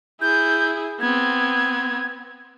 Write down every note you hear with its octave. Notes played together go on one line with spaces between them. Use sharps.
E4 G#4 G6
B3 C4 G#6